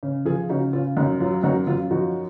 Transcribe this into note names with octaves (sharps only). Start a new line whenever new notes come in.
C#3
F3 F4 G#4
C#3 D#4 F#4
C#3 F4
F#2 D#4
F#3 F4
F#2 D#4 F#4
F#2 F4
F3 D#4 F#4